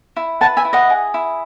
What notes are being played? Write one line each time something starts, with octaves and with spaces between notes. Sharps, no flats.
E4
B4 F#5 A5
E5 G#5
E4
D#5 F#5
G#4
E4